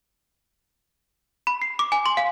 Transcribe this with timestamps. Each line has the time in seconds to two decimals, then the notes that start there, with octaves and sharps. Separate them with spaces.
1.47 B5
1.62 C7
1.79 D6
1.92 G#5
2.06 C6
2.17 F5